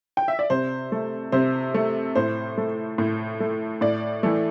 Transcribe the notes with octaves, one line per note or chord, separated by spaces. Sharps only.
G5
E5
D5
C3 C5
A3
C3 C5
A3
A2 C5
A3
A2
A3
A2 D5
E3 A3